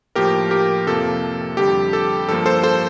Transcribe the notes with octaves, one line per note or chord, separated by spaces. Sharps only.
A2 F3 A#3 G4 A#4
G4 A#4
F2 C3 F3 A#3 A4
F2 D3 G3 G4
A4
G2 F3 A#3 A4
A4 C5
A4 C5